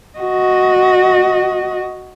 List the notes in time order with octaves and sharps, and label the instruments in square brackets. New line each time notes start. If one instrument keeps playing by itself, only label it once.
[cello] F#4 D#5